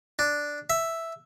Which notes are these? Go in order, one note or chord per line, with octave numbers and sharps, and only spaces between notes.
D4
E5